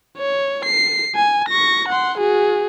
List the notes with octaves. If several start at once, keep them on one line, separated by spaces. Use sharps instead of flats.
C#5
C7
G#5
C#6 A#6
F#5 C6
F#4 G#4